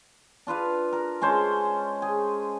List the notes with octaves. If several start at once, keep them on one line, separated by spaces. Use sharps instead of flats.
D4 F4 B4 F5
A#4
G#3 C#4 C5 A5
G#4